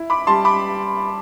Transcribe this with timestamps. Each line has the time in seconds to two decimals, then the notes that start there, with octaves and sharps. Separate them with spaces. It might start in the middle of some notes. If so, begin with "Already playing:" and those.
Already playing: E4
0.10 B5 D6
0.27 G3 A5 C6
0.45 B5 D6